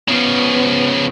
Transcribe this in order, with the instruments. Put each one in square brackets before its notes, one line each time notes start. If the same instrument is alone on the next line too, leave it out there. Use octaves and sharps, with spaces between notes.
[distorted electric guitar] C#3 F3 [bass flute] B3